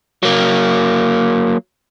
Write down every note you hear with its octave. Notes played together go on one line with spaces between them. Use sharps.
F#3 A#3